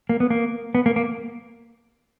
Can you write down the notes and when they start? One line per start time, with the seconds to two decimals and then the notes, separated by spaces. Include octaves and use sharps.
0.09 A#3
0.20 B3
0.30 A#3
0.75 B3
0.86 A#3
0.96 A#3